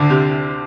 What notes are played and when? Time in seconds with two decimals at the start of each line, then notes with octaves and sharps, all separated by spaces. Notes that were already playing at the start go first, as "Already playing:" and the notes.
Already playing: D2 D3
0.10 C3